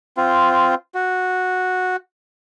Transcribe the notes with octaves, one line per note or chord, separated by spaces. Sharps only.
C4 F4
F#4